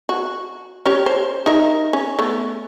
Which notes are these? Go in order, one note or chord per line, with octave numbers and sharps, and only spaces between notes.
F#4
C#4 G4 C#5
C5
D#4 A#4 E5
C#4
A3 B3